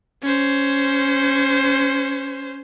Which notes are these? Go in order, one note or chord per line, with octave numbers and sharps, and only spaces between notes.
C#4 C5